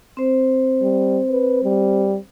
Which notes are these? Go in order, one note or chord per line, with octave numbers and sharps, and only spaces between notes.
C4 C5
G3
B4
G3